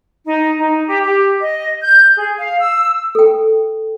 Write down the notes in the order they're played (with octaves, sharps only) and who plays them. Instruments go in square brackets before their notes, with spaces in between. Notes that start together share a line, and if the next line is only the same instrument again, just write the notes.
[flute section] D#4
D#4
G4
G4
D#5
G6
G#4
F5
E6
[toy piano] A4 G5